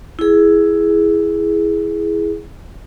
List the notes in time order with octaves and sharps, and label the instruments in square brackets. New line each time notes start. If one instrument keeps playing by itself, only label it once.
[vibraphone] E4 G#4